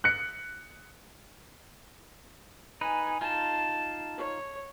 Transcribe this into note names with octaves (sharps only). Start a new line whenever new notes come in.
F#6 C#7
D#4 B4 G#5
D#4 F4 A5
C#5